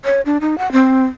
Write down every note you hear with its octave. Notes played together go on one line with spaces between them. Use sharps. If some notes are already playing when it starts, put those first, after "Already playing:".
C#5
D4
D#4
F#5
C4